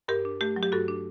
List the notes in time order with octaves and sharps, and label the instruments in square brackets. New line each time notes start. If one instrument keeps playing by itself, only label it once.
[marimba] G2 G4 A#4
D4
A3 G4
F#3
G4
G2 F#4 A4
D4